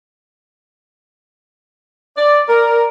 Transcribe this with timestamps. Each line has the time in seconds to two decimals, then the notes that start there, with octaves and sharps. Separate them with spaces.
2.17 D5
2.49 A#4